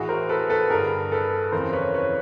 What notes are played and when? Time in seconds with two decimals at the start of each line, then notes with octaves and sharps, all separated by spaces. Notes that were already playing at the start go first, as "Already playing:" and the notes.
Already playing: A2 E3 F#4 G#4
0.09 A#4 C5
0.29 A4 B4
0.50 A4 B4
0.70 G2 D3 G#4 A#4
1.12 A4 B4
1.52 F2 C#3 E3 A#4 C5
1.73 B4 C#5
1.94 B4 C#5